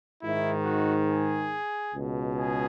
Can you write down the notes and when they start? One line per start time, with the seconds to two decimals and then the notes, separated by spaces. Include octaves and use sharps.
0.22 G#2 D#3 E4
0.65 F#4
1.08 G#4
1.93 C#2 B2
2.36 G#4